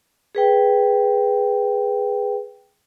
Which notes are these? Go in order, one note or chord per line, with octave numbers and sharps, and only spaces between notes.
G#4 B4 G5